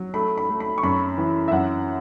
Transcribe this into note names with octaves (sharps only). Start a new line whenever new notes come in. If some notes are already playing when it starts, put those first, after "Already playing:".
Already playing: F#3
A3 B5
B5
A3
B5
C#6
F#2 B5
E3
E5
F#2 F#5